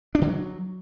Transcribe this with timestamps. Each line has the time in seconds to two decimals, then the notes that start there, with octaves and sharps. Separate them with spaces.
0.15 D4
0.21 D3
0.28 F#3